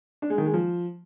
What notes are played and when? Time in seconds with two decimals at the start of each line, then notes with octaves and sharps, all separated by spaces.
0.22 D4
0.30 G#3
0.38 D#3
0.46 G#3
0.54 F3